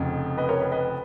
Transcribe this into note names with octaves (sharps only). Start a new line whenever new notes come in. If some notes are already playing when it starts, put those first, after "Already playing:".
Already playing: F1 F2 C#3
B4 D#5
A#4 C#5
B4
B4 D#5